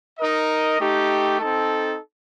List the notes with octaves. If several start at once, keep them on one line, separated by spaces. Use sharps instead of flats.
D#4 A#4 D#5
A3 D#4 G4
C4 D#4 A4